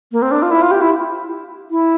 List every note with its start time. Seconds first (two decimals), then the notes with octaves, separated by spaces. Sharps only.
0.12 A#3
0.22 C4
0.31 D4
0.42 F4
0.51 E4
0.62 F4
0.71 G4
0.81 E4
1.71 E4